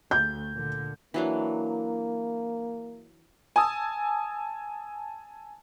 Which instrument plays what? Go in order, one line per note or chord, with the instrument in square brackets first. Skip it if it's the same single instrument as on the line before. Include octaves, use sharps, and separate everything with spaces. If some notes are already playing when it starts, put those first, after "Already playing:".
[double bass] D2 [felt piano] G6
[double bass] A#2 D3
[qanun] E3 F#3 D4 [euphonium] A#3
[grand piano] G#5 A5 D#6 E6